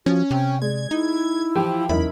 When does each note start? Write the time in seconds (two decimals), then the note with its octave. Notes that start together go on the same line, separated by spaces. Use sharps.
0.06 F3 C#4 F#4
0.31 C3 G5
0.62 G#3 D5 G#6
0.91 D#4 E4
1.55 E3 F3 G4 G5
1.89 F#1 E2 D#4 E4 A#4 B5